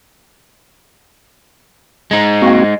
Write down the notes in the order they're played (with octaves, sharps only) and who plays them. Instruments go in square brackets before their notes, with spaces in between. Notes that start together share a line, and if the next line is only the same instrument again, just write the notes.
[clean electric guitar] G#3 D#4
[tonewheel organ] A#3 C4 F#4